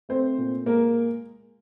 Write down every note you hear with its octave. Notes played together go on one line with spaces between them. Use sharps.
A3 C4 C5
A#2
G#3 A#3 A#4